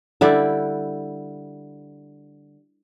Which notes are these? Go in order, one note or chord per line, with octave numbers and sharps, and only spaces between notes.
D3 G3 E4 D5